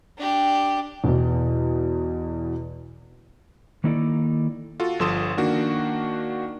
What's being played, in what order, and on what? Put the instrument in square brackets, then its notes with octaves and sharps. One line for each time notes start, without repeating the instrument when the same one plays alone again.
[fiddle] D4 G4
[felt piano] E2 B2
[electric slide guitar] D#3 A#3 D#4 E4 A4 D5
[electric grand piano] F4 F#4 A4
G1 F3 A4 C6 D#6 E7
D#3 A#3 D4 F#4